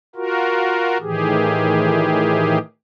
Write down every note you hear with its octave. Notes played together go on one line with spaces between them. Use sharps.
F4 F#4 A#4
A2 D#3 E3 G4 G#4